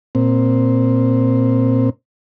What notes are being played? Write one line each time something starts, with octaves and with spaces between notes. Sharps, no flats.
A#2 C4